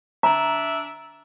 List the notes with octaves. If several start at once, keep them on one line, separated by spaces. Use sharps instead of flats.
D4 E5 A#5